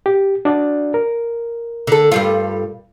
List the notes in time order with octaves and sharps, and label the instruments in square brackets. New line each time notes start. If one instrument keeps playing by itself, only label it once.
[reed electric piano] G4
D4 F#4 D5
A#4
[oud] D3 A4
G2 G3 F4